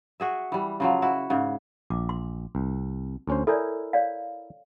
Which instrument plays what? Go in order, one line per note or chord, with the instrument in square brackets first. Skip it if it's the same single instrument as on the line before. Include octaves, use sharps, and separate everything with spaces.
[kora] F#4 G#4 E5
E3 G3
C#3 F3 F#3
E4 F#4
G#2 C#3
[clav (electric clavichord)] A#1 [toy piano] D6
[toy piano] C6
[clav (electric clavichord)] C2
D2 C#4 C5
[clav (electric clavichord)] E4 A#4 G#5 [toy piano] A4 C#5 D5
[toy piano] C#5 D5 F5